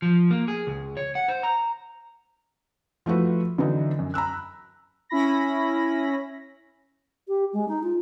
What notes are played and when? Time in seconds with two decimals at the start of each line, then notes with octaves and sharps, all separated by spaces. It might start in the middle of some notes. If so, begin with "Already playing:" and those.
0.02 F3
0.31 A#3
0.48 G#4
0.67 C#2
0.97 C#5
1.15 F#5
1.28 C5
1.43 A#5
3.06 F3 A3 E4 F#4 B4
3.58 D3 E3 F#3 D#4
3.99 F#2
4.14 A#5 B5 E6 F#6
5.09 C#4 E4 B5 A#6
7.27 G4
7.53 G#3
7.67 D#4
7.83 F4